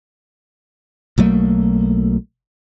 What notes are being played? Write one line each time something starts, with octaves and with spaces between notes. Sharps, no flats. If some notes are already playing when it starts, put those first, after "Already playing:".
B1 F#3 A3 A#3